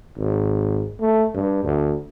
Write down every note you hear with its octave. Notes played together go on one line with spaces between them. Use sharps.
G#1
A3
G2
D2